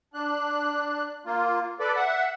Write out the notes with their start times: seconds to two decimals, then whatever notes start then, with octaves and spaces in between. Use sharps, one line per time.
0.14 D4 F#6
1.26 A#3 F4
1.80 A4 B4 D5
1.96 E5 F#5